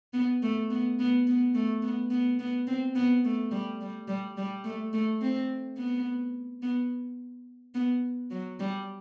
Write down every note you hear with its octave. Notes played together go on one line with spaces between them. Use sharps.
B3
A3
B3
B3
B3
A3
B3
B3
B3
C4
B3
A3
G3
G3
G3
G3
A3
A3
C4
B3
B3
B3
F#3
G3